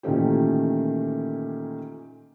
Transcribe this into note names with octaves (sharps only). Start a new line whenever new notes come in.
A#2 D#3 E3 A3 C#4 G4